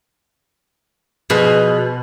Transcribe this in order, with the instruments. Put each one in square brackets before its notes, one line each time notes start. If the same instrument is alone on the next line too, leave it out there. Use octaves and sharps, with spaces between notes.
[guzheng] B2 [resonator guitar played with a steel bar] F3 G#4 B4